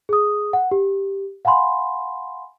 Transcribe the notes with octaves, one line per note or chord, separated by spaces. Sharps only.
G#4 D#6
F#5
G4
F5 F#5 G#5 B5 C6